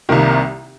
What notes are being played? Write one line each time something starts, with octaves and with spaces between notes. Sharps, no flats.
C2 C3 D#3 A#3